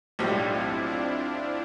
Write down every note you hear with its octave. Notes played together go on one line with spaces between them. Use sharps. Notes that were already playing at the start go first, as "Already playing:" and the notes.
B1 A2 G3 D4 F4
C4 E4
D4